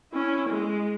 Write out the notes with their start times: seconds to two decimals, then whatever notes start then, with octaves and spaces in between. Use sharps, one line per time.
0.12 C#4 E4
0.50 G#3